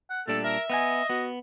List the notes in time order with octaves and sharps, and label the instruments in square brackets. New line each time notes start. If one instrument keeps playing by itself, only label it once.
[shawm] F#5
[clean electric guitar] A#2 G3 D4 [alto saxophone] A3 [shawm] A4
[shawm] A#4 [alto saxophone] E5
[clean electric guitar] B3 F#5 G#5 [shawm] D#5
[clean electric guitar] B3 [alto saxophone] F#4